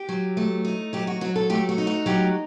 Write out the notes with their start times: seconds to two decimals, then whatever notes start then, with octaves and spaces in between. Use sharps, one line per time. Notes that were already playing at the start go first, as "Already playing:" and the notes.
Already playing: G4
0.09 F#3
0.37 A3
0.65 D#4
0.93 F#3 G4
1.07 F#4
1.21 F#3 F#4
1.36 A4
1.50 A3 G4
1.69 F#4
1.78 D#4
1.87 F#4
2.06 F#3 G4